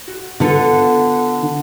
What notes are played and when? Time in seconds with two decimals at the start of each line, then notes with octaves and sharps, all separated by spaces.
0.08 F#4
0.40 D3 B3 F4 A4